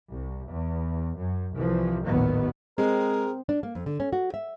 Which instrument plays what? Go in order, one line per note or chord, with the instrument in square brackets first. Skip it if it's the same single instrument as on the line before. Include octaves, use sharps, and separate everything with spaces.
[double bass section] C2
E2
F#2
C2 E3 F3
A1 D#2 A#2 D#3 F#3 B3
[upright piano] G#3 [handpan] C4 [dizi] G#4 [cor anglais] A#4
[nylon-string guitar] D4
A#3
F2
D3
C#4
F#4
E5